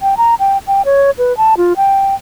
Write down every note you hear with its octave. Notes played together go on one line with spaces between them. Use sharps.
G5
A#5
G5
G5
C#5
B4
A5
F4
G5